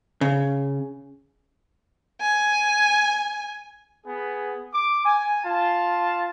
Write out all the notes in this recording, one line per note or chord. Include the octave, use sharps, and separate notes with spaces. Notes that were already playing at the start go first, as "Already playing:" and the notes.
C#3
G#5
B3 G#4
D6
G#5
F4 A5